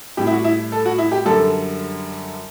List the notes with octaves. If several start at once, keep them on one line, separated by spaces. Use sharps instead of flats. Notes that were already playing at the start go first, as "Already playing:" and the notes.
A2 G3 G4
E4
F#4
E4
A4
F#4
E4
G4
F#2 D3 G3 A4